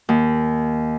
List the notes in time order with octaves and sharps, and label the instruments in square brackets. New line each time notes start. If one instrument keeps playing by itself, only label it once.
[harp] D#2